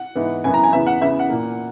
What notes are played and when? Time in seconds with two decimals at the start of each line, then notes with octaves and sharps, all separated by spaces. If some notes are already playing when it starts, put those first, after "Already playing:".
Already playing: F#5
0.15 G#2 E3 B3
0.44 F#2 E3 B3 G#5
0.54 A#5
0.64 G#5
0.72 E2 C#3 E3 B3 E5
0.86 F#5
1.01 C#3 E3 B3 E5
1.19 F#5
1.29 A#2 A#3